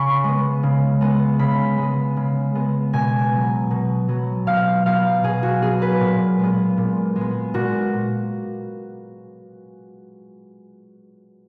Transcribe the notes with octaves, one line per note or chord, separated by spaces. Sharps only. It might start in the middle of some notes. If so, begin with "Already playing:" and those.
Already playing: C#3 F#5 G#5 B5 C#6
G#3 B3
C#3
G#3 B3
C#3 B5
G#3 B3
C#3
G#3 B3
B2 G#5
F#3 B3
B2
F#3 B3
B2 F5
F#3 B3 F5
B2 G#4
F#4
F#3 B3 G#4
B4
A#2
G#3 B3
A#2
G#3
B3
A#2 F#4